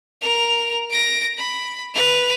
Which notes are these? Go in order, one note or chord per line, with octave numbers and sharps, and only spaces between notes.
A#4 F7
A#6 D7
B5
B4 F7